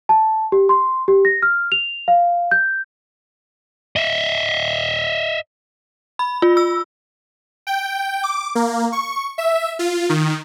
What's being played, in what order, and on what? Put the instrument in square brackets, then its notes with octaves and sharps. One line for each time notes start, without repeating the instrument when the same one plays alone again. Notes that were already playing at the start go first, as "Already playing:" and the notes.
[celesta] A5
G4
C6
G4
A#6
F6
F7
F5
G6
[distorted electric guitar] D#5 E5
[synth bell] B5
F4
E6
[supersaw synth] G5
D6
A#3
C#6
E5
F4
D#3